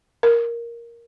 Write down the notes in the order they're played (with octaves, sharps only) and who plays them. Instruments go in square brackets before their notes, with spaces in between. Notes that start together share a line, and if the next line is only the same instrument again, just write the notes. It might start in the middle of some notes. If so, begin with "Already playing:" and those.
[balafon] A#4